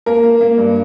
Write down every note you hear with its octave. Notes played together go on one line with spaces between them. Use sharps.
A#3 A#4
A#3
A#3
G2